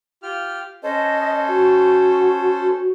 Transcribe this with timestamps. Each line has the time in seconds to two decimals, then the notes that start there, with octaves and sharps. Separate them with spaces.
0.23 F4 G4 F6
0.83 C#4 A4 C5 D#5
1.48 F#4